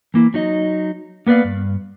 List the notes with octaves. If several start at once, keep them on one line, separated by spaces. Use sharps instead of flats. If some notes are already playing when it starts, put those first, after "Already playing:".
E3 A#3 E4
F#3 D#4 D#5
A#3 B3 B4 D5 F5
G2